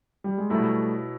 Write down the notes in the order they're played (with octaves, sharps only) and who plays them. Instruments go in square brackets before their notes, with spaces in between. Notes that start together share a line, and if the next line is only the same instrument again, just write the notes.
[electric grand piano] G3
G#3
[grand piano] B2 F#3 B3 E4 [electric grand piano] G3 A3